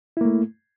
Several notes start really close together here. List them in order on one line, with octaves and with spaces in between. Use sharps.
E4 A#3 A3